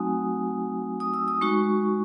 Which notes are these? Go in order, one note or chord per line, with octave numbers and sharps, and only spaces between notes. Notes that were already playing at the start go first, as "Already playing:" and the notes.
Already playing: F#3 A3 C4 D#4 F#4 F#5 G#5 D#6
D#6
E6
D#6
G#3 D#4 F#4 C#6